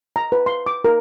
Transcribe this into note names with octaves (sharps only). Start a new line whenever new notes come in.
A#5
B4
C6
D6
A#4